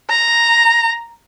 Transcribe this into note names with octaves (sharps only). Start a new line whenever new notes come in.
A#5